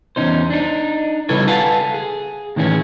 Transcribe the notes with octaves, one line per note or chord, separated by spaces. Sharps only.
E2 G#2 C#4 D#4 C5
D4 D#4
C#3 G3 E4 A4 B4 C#5
A4 B4 F5 F#5 G#5 A5
G#4
A2 D#3 E3 C#4 G#4